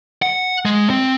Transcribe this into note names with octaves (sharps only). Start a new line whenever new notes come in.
F#5
G#3
C4